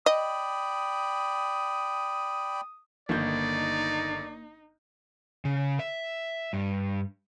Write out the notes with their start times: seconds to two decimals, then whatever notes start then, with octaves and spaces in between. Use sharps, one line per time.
0.06 D5 D#5 G5 B5 D#6
3.09 G1 D#3 A#3 D#4 D5 G6
5.45 C#3
5.79 E5
6.53 G2